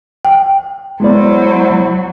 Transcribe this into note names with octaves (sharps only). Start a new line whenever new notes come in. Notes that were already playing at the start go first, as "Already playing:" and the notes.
G5
F#3 G#3 B3 E4 C5 D5